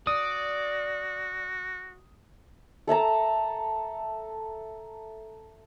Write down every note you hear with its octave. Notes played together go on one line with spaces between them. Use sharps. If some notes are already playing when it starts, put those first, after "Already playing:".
F#4 D5 D#6
A4 E5 A5 A#5